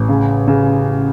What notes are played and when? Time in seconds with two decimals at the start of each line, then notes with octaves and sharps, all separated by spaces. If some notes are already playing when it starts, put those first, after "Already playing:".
Already playing: A1
0.09 C#3
0.48 C#3